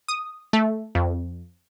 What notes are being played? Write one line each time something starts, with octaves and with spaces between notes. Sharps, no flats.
D#6
A3
F2